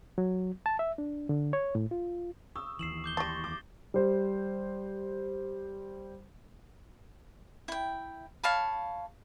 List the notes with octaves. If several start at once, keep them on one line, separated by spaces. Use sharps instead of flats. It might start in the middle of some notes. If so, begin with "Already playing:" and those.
F#3
A5
E5
D4
D3
C#5
A2
F4
C#6 D#6 E6
D#2 E3 C7 E7 F#7
D6 G6 G7
G3 A5 C6 C#6 A6 A#6
D6
G3 C5
E4 G5
C#5 F5 A5 B5